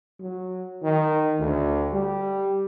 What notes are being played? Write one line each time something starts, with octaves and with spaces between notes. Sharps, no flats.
F#3
D#3
D2
G3